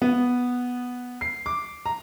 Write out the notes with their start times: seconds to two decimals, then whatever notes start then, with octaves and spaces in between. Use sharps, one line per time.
0.02 B3
1.21 C7
1.46 D6
1.86 A#5